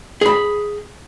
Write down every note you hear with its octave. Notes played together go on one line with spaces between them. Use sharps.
G#4 B5